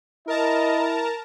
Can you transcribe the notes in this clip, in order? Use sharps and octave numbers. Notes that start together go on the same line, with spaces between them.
E4 A#4 D#5 A5 A#5